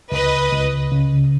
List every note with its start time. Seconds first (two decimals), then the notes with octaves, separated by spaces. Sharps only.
0.12 C#2 B4 D#5
0.52 C#2
0.92 C#3